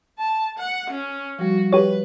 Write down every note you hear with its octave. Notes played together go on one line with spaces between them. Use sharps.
A5
F#5
C#4
F3 G3 F#4
G4 B4 C#5